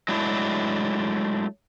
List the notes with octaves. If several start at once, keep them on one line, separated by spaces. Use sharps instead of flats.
F#3 G#3 A3 D4 E4